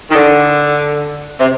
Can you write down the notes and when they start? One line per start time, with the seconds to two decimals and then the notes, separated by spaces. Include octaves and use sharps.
0.10 D#3
0.14 D3
1.40 C3